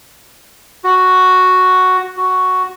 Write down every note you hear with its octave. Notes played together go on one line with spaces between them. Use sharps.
F#4
F#4